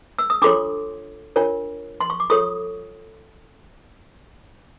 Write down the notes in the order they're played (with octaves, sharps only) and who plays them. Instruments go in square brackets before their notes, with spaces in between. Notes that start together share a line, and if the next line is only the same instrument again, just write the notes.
[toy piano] E6
D#6
D4 F4 A4 C#5 C6 D6
D4 F4 A#4 C#5
C6
C#6
D6
F4 A4 C#5 C#6 D#6